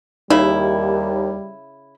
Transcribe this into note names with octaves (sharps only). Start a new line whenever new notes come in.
D#2 C#3 G3 D#4 E4